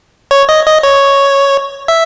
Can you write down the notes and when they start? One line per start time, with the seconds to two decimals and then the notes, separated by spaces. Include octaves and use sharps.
0.31 C#5
0.49 D#5
0.66 D#5
0.83 C#5
1.88 E5